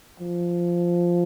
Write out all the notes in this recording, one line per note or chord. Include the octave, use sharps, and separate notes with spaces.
F3